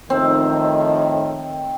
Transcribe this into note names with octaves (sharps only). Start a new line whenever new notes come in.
F2 A2 D#3 C4